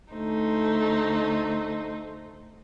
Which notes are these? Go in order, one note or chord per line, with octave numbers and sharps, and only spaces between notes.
D2 A3 D#4 C5